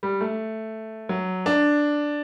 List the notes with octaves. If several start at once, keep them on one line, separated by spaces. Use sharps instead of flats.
G3
A3
F#3
D4